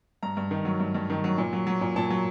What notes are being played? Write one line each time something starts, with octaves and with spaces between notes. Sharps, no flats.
G2 A#5
G2
D#3
F#3
G2
G2
D#3
F#3
A#2
F#3
F#3
A#2
A#2 A5
F#3